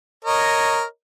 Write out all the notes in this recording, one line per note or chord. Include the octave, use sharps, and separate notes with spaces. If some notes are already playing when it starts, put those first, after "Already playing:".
A#4 C#5 D#5